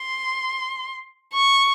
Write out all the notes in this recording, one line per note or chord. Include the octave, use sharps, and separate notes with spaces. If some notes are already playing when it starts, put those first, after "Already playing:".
Already playing: C6
C#6